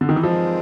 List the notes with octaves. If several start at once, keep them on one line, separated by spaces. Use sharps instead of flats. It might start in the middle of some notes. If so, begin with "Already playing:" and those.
D3
D#3
E3
G2 D#3 F3 G#3 C4